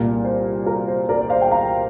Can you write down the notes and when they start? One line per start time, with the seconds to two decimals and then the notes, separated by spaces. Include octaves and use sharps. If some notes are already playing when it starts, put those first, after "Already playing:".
Already playing: C2 A#2 G3 A#3
0.25 C5
0.66 A#4
0.88 C5
1.09 A#4 D5
1.21 D5
1.30 C5 F5
1.42 G5
1.51 F5 A#5